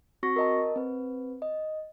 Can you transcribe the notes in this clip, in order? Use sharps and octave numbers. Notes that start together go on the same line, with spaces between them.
C4 F#4 C#6 A#6
A#4 D#5 A5
C4 B4
D#5